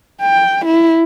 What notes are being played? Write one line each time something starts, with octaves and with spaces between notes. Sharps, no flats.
G5
E4